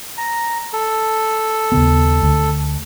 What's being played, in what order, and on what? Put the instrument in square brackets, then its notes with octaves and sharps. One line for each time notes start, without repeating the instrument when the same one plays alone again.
[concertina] A#5
A4
[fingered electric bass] D#2 C#3 B3
D2